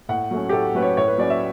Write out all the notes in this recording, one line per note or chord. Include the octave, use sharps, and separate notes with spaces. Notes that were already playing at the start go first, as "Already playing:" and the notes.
A2 F#5
F#3 A3 C#4
G4
A2 A4
F#3 A3 C#4 B4
C#5
A2 C#5
B4
F#3 C#4 D5
E5